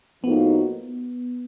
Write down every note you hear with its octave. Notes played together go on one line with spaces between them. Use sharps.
A2 F3 A#3 B3 D#4 F#4